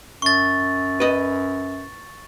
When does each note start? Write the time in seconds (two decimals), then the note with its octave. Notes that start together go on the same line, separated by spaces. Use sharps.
0.22 F#2 C#6 A6
1.00 B4 D#5